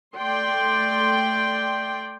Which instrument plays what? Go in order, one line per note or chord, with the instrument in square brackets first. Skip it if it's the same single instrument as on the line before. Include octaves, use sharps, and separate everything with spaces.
[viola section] A3 D5 G5 C6